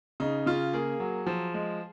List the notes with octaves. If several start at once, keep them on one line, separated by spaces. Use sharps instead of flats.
C#3 D#4
C#3 F4
A#3 G#4
F#3
F3
G#3